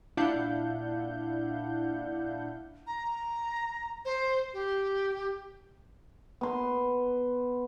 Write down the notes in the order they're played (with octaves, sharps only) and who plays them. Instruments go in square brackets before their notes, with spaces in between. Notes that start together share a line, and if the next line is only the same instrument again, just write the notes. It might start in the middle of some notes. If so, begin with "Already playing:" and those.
[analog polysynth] A#2 D4 E4 F5 F#5 G6
[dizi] A#5
C5
G4
[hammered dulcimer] B3 C6